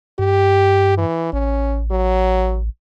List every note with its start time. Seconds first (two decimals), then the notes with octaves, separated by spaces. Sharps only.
0.19 G2 G4
0.98 E3
1.33 A1 C#4
1.91 F#3